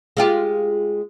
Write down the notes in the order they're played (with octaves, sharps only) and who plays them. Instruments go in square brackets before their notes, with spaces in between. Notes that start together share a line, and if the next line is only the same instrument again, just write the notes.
[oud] G#3 F4 G4